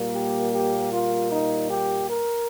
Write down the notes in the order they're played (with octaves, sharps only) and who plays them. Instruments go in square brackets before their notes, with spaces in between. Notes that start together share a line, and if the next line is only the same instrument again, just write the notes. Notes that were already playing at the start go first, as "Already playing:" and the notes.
Already playing: [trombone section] A#2 G3 A#3
G4
G4
F4
D#4
G4
A#4